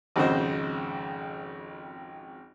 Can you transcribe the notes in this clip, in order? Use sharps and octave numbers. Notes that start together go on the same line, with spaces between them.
G#1 F2 C#3 F#4 C5 D#5